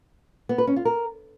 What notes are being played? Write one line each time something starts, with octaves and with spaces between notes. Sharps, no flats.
B3
B4
C#4
F4
A#4